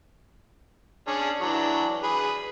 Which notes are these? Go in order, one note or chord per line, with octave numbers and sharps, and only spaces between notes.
C#4 D4 G#4
E3 F#3 D4
G#4 B4